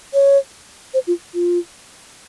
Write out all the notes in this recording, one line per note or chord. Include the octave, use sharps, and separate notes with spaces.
C#5
C5
F4
F4